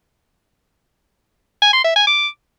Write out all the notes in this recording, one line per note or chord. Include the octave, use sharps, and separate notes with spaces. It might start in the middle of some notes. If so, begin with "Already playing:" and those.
G#5
C6
E5
G#5
D6